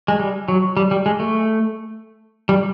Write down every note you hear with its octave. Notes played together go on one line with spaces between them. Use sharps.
G#3
G3
F#3
G3
G3
G#3
A3
G3